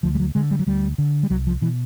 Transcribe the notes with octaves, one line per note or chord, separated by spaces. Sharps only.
D2 F3
G3
F#3
D3 G#3
G3
F#3
D2 G3
D3
G3
C2 F#3
F3
B2 E3